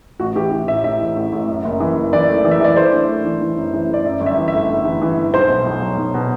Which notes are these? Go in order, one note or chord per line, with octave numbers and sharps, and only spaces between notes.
A1 F#4
E3 G4
E3
A2 E5
A2 E5
E3
A1
A1
F#2
F#1
E3
F#1
E3 D5
A3
E3
E5
E3 D5
A3 C5
D4
A3
E3
E3
F#2
E3
F#2 D5
F#2 E5
G1
E5
E3
E5
A3
G1
E3
E3
G1
B1 C5
B2
B1
F#3
B1
B2